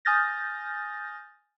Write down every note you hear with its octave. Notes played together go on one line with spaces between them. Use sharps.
G#5 D#6 F6 G6 A6 A#6